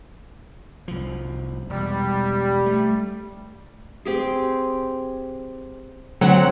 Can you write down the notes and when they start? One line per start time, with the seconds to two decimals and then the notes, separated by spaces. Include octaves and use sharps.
0.88 C2 F3
1.70 E1 G3
2.66 A3
4.05 C4 G4 G#4
6.21 D3 F#3 C4 C#5 F#5